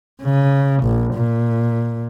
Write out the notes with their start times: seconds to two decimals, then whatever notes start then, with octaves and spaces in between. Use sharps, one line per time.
0.23 C#3
0.84 A#1
1.14 A#2